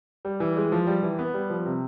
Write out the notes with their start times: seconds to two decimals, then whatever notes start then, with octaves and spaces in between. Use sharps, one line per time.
0.25 G3
0.40 E3
0.57 G#3
0.72 F3
0.87 G3
1.03 E3
1.19 B3
1.34 G3
1.50 F3
1.66 C3